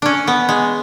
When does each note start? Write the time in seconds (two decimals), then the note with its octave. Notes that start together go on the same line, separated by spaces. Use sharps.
0.02 C#4 D4
0.27 B3
0.49 G#3